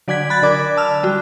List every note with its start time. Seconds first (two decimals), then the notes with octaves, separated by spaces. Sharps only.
0.08 D3 F#3 D5 F#5 G#6 B6
0.30 B5 F#6 G#6 A6
0.42 D3 A#4 D5 D6
0.77 A5 E6 F6
1.03 F#3 G3 F#4